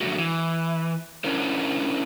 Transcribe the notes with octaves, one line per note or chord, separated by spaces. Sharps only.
F#2 D3 D#3 F3 A3 F#4
E3
C#4 D4 E4 F4 A#4 C5